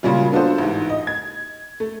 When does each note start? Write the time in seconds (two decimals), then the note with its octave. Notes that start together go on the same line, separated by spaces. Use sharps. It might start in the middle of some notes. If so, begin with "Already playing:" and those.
0.03 A#2 C#3 F#3 G3 C#4 F4
0.32 B3 D4 F4 F#4 A4 C5
0.58 A1 G#2
0.89 D#5
1.07 G#6
1.80 A3